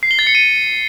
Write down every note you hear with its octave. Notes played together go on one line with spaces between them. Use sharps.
C7
G7
A6
C#7
D#7